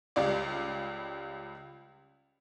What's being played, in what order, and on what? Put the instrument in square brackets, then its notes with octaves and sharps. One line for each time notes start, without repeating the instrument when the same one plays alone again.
[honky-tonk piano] C#2 G3 F4 D5